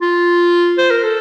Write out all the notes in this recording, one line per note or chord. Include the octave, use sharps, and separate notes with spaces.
F4
C5
A#4
A4